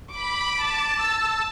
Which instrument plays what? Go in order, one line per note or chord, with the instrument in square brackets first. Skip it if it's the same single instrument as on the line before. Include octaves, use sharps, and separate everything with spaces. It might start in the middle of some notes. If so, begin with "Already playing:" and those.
[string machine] B5 [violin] D6
[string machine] A5
[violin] E6